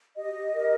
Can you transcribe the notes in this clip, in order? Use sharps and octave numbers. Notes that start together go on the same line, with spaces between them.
G4 D#5
G4
A#4